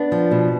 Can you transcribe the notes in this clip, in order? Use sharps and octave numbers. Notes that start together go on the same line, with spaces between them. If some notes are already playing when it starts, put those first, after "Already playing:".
Already playing: B3 D4
F3
B2